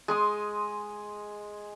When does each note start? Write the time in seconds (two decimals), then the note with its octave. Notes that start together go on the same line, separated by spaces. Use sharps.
0.08 G#3 C6 D#6